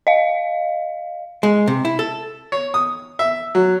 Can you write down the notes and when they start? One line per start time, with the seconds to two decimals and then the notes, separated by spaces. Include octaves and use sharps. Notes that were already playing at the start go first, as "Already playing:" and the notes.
0.07 D#5 F5
1.43 G#3
1.68 C3
1.85 E4
1.99 A4
2.52 C#5
2.74 D#6
3.19 E5
3.55 F#3